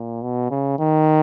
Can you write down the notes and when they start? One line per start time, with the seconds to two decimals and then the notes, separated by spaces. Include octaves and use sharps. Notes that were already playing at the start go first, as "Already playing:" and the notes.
Already playing: A#2
0.23 B2
0.51 C#3
0.79 D#3